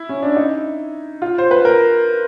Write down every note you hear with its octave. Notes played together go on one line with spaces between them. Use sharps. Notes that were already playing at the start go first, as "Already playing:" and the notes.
Already playing: E4
C#4
D4
D#4
F4
C5
B4
A#4